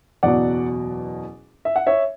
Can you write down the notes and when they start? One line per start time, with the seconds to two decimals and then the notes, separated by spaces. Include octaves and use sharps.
0.23 F#1 E2 B2 F#3 D5 F#5
1.65 E5
1.76 F#5
1.87 C#5 E5